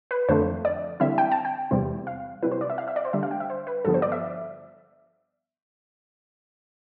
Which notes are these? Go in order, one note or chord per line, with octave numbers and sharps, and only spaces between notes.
B4
F2 D3 F3 A3 C5
D5
D3 G3 C4 E4 E5
G5
A5
G5
E2 C3 G3 C4 E4
F5
C3 G3 C4 E4 B4
C5
D5
E5
F5
E5
D5
C5
D3 G3 D4 E5
F5
G5
E5
C5
B4
G2 D3 F3 B3 A4
C5
D5
E5